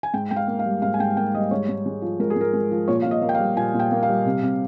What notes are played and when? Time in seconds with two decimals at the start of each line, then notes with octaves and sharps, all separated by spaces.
0.03 G#5
0.14 G#2 G5
0.31 G#2 G5
0.36 F5
0.48 A#3
0.59 F5
0.66 G3
0.82 G#2 F5
0.94 G#5
1.00 G#2 G5
1.17 A#3 G5
1.35 G3 D#5
1.51 G#2 C#5
1.69 G#2
1.86 G#3
2.02 F3
2.20 G#2 A#4
2.30 G#4
2.36 G#2 A#4
2.53 G#3
2.71 F3
2.88 A#2 C#5
3.02 A#2 F5
3.11 D#5
3.22 A#3
3.29 G5
3.35 F5
3.40 G3
3.56 A#2 G#5
3.74 A#2
3.79 G5
3.92 A#3
4.03 F5
4.09 G3
4.26 C3
4.43 C3